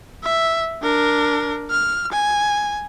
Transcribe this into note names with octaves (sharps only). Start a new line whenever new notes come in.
E5
D4 A#4
F6
G#5